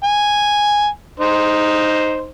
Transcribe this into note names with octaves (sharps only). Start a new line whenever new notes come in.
G#5
D#4 C5